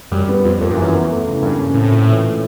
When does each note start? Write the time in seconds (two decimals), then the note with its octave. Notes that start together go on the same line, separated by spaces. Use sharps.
0.11 F#2 G3
0.29 B3
0.44 F2 F3
0.61 F2 A#3
0.70 G2
0.77 F#2 E3
0.94 E2
1.09 A3
1.26 C#3
1.42 G2 A#3
1.59 C#4
1.74 A2 C4
1.91 A#2
2.07 E3
2.23 A3